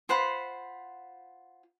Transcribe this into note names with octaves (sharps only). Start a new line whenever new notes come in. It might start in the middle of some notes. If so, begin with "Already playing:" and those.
F4 C5 F#5 B5